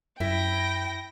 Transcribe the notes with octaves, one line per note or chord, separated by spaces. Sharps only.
F#2 E4 G5 A#6